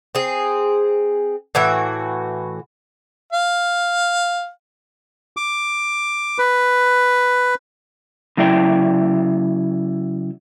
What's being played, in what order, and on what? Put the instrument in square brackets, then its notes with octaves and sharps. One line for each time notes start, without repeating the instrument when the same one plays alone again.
[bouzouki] C4 G#4
A2 E3 F#4 E5
[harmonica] F5
[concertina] D6
B4
[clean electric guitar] C#3 F#3 E4 D5 G5